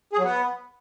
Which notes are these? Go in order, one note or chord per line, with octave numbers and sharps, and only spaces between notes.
G#4
F#3
B3